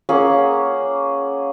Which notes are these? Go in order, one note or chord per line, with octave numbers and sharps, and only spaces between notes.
A#3 C#4 G#4 F#5